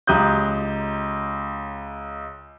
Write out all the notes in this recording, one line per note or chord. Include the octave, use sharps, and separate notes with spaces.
C#2 G4 A#5 D#6 F#6 G6